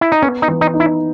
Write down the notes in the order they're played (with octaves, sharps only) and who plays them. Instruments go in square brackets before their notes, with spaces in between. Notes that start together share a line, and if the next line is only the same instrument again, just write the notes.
[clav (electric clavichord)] E4
D#4
[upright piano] B3 [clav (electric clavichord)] C#4
[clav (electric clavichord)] D#4
[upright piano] E3
[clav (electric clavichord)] D#4
[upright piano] D#4
[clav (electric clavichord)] E4